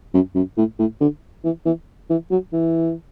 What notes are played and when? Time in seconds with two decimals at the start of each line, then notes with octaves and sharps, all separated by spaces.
0.14 F#2
0.35 F#2
0.57 A2
0.79 A2
1.01 D3
1.44 E3
1.66 E3
2.10 E3
2.31 F#3
2.53 E3